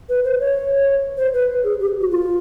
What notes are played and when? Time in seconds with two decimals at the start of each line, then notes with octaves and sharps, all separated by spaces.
0.09 B4
0.24 C5
0.40 C#5
1.17 C5
1.33 B4
1.64 G#4
1.80 G4
2.01 F#4
2.11 F4